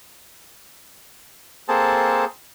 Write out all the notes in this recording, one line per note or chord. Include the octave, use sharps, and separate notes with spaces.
A#3 C4 G#4 A4 C5 A5